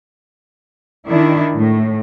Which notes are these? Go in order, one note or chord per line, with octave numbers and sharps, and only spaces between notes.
D#3 D4 E4
A2